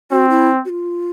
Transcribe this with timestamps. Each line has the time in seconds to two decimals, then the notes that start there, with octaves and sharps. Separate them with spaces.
0.11 C4 F#4
0.30 E4
0.65 F#4
0.69 F4